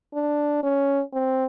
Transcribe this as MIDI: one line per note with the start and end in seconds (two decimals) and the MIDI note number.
0.14 0.59 62
0.63 1.02 61
1.13 1.45 60